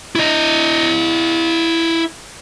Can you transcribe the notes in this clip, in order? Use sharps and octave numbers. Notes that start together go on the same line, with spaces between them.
E4 D#5